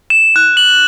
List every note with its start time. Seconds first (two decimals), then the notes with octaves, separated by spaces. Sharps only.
0.10 E7
0.36 F#6
0.57 F#7